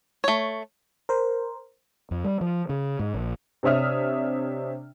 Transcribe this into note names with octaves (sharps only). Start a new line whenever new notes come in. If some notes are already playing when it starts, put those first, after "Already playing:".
A3 C#5
A#4 C5
F2
G3
F3
C#3
G#2
A#1
C3 D4 C#5 E5 D#6 F6